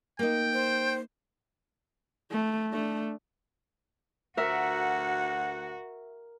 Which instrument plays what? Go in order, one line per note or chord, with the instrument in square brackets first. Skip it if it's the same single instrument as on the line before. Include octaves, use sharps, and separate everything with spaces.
[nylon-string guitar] A#3 D#4 [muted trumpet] G5
[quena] C5
[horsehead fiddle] A3
A3 D4
[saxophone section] D2 F#5 [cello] F#4 [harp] A#4 E5